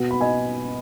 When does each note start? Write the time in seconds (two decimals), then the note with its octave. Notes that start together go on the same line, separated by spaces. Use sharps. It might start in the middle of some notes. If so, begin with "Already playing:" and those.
Already playing: B2 B3
0.11 B5
0.21 D#5 G#5